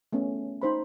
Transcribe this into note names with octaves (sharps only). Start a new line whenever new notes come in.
A3 B3 C#4
D#4 C5 B5